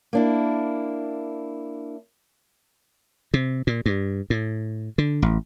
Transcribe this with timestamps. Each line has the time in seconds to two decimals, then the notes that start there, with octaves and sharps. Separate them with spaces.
0.13 A#3 D4 E4
3.34 C3
3.67 A#2
3.86 G2
4.30 A2
4.98 D3
5.22 A1